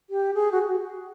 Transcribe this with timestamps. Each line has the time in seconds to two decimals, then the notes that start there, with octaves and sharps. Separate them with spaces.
0.10 G4
0.34 G#4
0.52 F#4